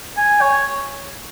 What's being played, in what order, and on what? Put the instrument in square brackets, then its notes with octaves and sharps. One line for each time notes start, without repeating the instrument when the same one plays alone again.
[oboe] G#5
C#5